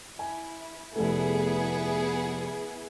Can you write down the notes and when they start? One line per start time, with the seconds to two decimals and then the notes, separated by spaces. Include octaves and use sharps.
0.19 E4 G#5
0.96 F1 A3 B3 E4 G#4